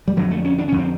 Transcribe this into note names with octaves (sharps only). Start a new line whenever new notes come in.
G3
F2 D3 F#3
A3
C#4
D4
F2 D3 C#4
C4